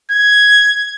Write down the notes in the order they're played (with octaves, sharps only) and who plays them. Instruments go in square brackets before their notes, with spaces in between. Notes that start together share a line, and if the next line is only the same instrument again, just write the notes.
[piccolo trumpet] G#6